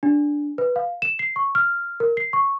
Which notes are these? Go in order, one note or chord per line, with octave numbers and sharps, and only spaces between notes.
D4
B4
F5
E7
C7
C#6
F6
A#4
C7
C#6